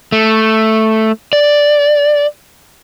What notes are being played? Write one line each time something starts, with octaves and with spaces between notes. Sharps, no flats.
A3
D5